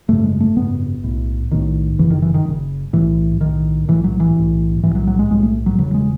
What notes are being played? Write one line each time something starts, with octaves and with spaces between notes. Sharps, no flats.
G#1 F#2 C#3 A3
G#3
A3
G#1 F#2 C#3 B3
B1 A2
B1 A2 D#3
F#1 F#2 C#3 E3
D#3
E3
D#3
F#1 F#2 C#3
B1 A2 E3
B1 A2 D#3
B1 A2 E3
F#3
E3
B1 A2
B1 A2 E3
F#3
F#3
G#3
B1 A2 G#3
A3
F#3
E1 E2 C#3 F#3
G#3